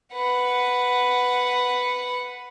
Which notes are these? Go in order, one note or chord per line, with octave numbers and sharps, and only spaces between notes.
B4 F#5